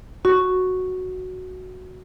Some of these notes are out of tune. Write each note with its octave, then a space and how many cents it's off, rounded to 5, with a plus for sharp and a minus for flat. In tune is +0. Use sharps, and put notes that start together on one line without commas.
F#4 +0 C#6 +0